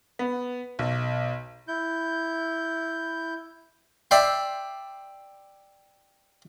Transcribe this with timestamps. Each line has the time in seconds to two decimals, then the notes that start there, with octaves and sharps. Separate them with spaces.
0.19 B3
0.79 B1
1.68 E4 G6
4.11 D5 E5 G5 C6